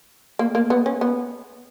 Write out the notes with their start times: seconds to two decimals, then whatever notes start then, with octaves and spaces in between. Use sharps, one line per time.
0.39 A#3
0.55 A#3
0.70 B3
0.86 C#4
1.01 B3